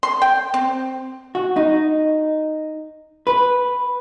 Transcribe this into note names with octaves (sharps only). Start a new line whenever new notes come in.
C6
G5
C4
F#4
D#4
B4